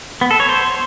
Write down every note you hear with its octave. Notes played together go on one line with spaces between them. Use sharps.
B3
A4
C#5
C5